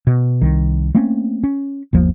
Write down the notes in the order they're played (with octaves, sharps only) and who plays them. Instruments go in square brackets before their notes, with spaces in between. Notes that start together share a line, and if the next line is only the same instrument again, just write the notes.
[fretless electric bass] B2
C2 D#3
A3 A#3 C4 C#4
C#4
G1 D#2 F3 A#3